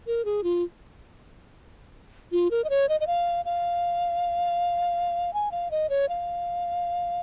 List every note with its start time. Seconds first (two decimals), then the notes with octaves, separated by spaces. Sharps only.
0.07 A#4
0.25 G#4
0.44 F4
2.32 F4
2.51 A#4
2.64 D#5
2.70 C#5
2.89 D#5
3.01 D#5
3.07 F5
3.45 F5
5.34 G#5
5.52 F5
5.71 D#5
5.90 C#5
6.09 F5